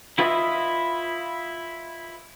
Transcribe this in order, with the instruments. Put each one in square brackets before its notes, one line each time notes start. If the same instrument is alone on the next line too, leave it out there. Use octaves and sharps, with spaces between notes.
[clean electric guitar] E4 F4 B4 C#5 D#5 E5